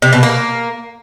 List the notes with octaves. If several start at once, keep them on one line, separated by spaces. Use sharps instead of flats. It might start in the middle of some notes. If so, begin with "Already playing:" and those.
C3
B2
A#3